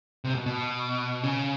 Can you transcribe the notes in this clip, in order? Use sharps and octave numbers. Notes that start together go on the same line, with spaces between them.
C3
B2
B2
C#3